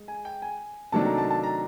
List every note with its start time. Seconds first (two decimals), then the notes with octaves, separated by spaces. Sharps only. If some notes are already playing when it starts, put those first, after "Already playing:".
Already playing: G#3
0.08 G#5
0.25 G5
0.42 G#5
0.92 C3 D#3 F#3 A3 D4 A5
1.05 A#5
1.18 A5
1.31 A5
1.43 A#5